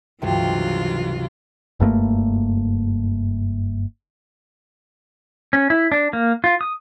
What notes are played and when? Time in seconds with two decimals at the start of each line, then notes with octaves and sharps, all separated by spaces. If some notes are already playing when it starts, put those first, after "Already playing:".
0.22 C#2 G2 C3 E3 F#3 F4
1.80 F#1 G2 A3 A#3
5.53 C#4
5.70 E4
5.92 D4
6.13 A#3
6.44 F4
6.61 D#6